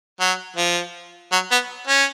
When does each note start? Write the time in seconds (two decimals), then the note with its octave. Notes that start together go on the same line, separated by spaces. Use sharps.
0.20 F#3
0.57 F3
1.32 F#3
1.51 B3
1.87 C#4